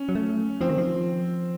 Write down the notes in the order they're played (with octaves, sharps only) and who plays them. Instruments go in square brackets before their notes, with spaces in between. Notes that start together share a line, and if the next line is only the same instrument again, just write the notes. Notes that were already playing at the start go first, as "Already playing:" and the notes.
Already playing: [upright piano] C#4
[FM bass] F#3
A3
[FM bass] F3 [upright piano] C4
[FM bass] D#3
F3